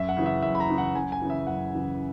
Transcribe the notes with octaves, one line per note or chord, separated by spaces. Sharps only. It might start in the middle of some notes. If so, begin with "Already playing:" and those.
Already playing: F#2 E5
F#5
C#3 E3
E5
F#2 E5
B5
A#5
C#3 E3
F#5
F#2 G#5
G#5
C#3 E3
E5
F#2 F#5
C#3 E3